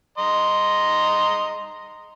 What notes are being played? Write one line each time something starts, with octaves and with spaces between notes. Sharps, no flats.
D#5 A#5 C6